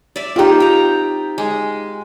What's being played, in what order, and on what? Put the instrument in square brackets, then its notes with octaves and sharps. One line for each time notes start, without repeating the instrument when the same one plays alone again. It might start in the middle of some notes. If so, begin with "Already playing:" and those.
[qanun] D5 E5
[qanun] C4 D#4 [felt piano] F4 G4
[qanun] G5 A#5
G#3